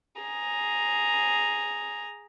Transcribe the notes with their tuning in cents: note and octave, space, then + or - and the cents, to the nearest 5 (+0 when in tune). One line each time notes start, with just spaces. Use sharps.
G#4 +0 A#5 +0